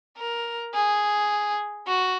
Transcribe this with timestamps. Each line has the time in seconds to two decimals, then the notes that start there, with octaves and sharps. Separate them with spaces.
0.17 A#4
0.74 G#4
1.87 F#4